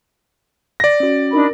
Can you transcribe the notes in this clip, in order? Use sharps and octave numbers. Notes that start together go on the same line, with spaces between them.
D5 A#6
C#4 F#4
D4 D#4 A#4 B5